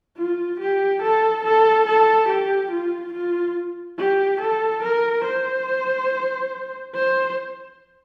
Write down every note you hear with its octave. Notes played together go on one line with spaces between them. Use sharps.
F4
G4
A4
A4
A4
G4
F4
F4
G4
A4
A#4
C5
C5